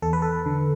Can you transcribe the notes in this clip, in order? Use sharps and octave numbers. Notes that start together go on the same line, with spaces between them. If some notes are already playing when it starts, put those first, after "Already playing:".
E2 A4
B4
A4
D3